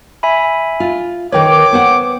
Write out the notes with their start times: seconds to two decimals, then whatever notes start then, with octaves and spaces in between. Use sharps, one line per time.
0.23 E5 G#5 B5
0.80 F4
1.32 D#3 A#4 B4 C#5 G5 D6
1.73 B3 C5 F#5